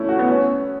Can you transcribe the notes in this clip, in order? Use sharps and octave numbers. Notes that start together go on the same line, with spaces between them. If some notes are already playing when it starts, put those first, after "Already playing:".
Already playing: A3 C#4 E4
F#4
B3
C#4